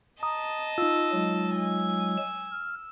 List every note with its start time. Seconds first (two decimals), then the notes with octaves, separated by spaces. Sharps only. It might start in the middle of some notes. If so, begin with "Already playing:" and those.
0.23 D#5 A5 A#5 D#6
0.78 D#4 F4 E6
1.12 F#3 G#3
1.56 G#5
2.17 E7
2.51 F6